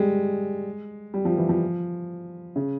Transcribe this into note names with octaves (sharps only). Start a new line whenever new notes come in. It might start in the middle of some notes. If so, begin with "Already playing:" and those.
Already playing: G3 G#3
G3
F3
E3
F3
C#3